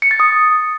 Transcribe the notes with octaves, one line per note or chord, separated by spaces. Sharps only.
C#7
A6
D#6